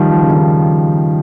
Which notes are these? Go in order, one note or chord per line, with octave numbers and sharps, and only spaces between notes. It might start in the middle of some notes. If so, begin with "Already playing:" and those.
Already playing: D#3 F3 G3
F3
C#3
D#3